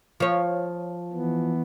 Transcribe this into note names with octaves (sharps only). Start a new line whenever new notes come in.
F3 C#5
E3 B3